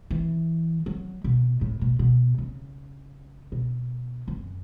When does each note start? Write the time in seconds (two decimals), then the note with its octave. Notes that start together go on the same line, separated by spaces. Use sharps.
0.10 E3
0.86 F#3
1.24 B2
1.61 A2
1.81 B2
1.99 B2
2.38 C#3
3.52 B2
4.28 F#2